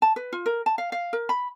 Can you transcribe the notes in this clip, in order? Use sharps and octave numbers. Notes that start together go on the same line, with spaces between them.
A5
B4
F4
A#4
A5
F5
F5
A#4
B5